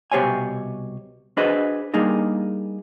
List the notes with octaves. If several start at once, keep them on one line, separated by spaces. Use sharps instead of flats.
C2 B2 G4 C5 C#5 G#5
D4 F#4 G#4 B4 C5 D#5
G3 A#3 D4 D#4 G#4